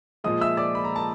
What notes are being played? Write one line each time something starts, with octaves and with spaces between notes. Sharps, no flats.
A#2 F3 G#3 D#5 D#6
E5 E6
D5 D6
B5
A#5
A5